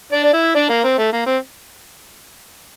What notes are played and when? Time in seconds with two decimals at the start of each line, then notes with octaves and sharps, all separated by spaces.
0.12 D4 D5
0.24 D5
0.33 E4 E5
0.55 D4 D5
0.69 A#3 A#4
0.84 C4
0.98 A3
1.12 A#3
1.26 C4